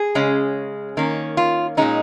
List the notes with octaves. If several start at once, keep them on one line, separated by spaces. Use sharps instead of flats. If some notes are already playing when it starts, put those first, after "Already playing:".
Already playing: G#4
C#3 G#3 C#4
D#3 A#3 C#4
F4
A#2 G#3 C#4 D#4